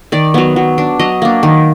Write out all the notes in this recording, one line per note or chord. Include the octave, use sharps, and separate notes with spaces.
D#3 D5
F#3 B3
F#3
D4
F#3 D#5
A#3 D4
D#3